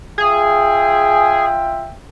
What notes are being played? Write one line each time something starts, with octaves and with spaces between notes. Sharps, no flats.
F4 G#4 E5 G5